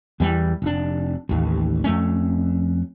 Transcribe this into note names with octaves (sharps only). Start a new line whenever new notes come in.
E2 E3 G3
F1 D4
A1 D#2
F2 A3 C#4